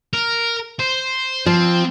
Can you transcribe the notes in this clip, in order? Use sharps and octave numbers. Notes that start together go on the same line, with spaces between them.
A#4
C5
F3 C4